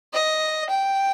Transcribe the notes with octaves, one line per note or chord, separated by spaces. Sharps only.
D#5
G5